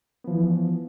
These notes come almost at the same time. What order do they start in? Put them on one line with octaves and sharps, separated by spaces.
B3 F3 E3